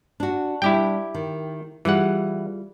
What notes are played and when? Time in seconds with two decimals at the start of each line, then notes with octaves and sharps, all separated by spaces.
0.20 D4 F#4
0.62 G3 D4 E4 G4 G5
1.15 D#3
1.85 E3 G3 F4 G#4 F#5